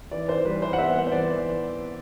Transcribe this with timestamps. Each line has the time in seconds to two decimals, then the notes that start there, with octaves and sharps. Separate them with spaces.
0.11 E3 D5
0.28 E3 C5
0.45 G3 B4
0.62 E3 C5
0.73 F#5
0.78 B3 E5
0.95 B3
1.07 C5
1.12 E3 D5